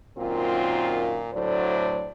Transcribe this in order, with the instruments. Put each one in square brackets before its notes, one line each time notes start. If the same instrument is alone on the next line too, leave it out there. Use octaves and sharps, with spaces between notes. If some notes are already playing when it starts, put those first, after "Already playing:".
[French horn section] F#2 A#2 D#3 C4 F4
D2 A2 D3 F#3 C5 D5